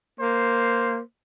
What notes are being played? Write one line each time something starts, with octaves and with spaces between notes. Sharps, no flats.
A#3 C5